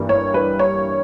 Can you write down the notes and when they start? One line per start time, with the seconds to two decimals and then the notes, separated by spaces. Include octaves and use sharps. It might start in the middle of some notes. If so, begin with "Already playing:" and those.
Already playing: G2 E3 G3 A#3
0.09 C#5
0.34 B4
0.59 C#5